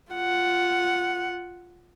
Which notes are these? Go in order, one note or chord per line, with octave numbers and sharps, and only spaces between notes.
F4 F#5